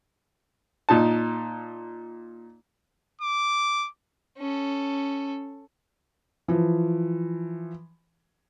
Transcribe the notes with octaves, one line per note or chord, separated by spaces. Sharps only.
A#2 D#4 A5
D6
C#4 A4
E3 F3